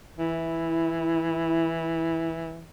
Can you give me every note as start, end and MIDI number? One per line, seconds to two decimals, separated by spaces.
0.18 2.65 52
0.18 2.28 64